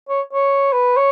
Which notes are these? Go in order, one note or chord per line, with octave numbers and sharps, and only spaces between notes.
C#5
C#5
B4
C#5